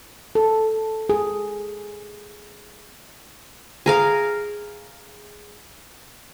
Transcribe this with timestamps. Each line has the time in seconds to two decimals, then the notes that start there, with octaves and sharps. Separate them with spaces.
0.35 A4
1.09 G#4
3.86 G#4 A#4 F5